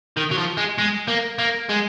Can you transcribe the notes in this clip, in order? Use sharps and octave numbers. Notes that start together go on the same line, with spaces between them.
D#3
F#3
F3
G#3
G#3
A#3
A#3
G#3